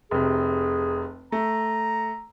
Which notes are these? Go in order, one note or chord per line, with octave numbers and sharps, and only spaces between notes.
F1 C3 G#4
A3 A#5